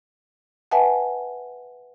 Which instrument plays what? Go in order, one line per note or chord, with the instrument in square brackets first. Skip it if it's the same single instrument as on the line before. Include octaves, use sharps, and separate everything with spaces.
[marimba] B4 E5 F#5 G#5 A5